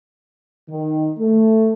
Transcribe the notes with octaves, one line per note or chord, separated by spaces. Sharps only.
D#3
A3